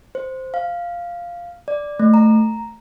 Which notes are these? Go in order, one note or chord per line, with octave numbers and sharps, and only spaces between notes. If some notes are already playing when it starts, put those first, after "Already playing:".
C5
F5
D5
A3
A#5